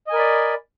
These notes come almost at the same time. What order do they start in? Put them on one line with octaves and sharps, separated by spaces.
D#5 G#5 A#4 B5 D5